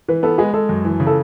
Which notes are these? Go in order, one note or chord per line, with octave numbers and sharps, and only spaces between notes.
E3 B4
B3 A4
G#3 G#4
G#3 A4
F#2
E3
C#3
A4